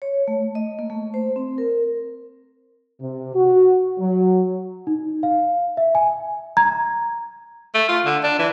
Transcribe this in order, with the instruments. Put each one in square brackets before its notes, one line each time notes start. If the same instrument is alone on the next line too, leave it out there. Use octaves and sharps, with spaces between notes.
[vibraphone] C#5
A3
D#5
A#3
A3
C5
C4
A#4
[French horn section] C3
F#4
F#3
[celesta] D#4
F5
E5
G#5
A#5 G#6
[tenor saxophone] A3
F4
D3
D4
E3